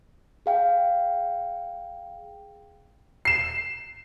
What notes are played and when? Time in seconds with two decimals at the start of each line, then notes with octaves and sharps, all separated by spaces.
0.46 G#4 F5 G5
3.25 C7 E7